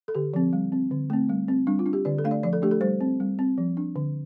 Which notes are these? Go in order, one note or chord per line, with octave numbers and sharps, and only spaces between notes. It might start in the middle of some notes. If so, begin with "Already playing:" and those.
A4
D3 G4
F3 C4
G3
C4
D3
A3 C4
G3
C4
G3 D4
F4
D4
G4
D3 D5
A4
A3 D4 F5
D5
F3 D5
A4
A3 D4 G4
A4
G3 C5
C4
G3
C4
F3
D4
D3